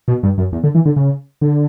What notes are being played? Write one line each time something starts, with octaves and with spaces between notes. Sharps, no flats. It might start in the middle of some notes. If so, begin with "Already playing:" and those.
B2
G2
F#2
E2
D3
E3
D3
C#3
D3